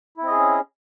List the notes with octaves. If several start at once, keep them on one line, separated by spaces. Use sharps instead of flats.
C4 C#4 E4 G#4 D#5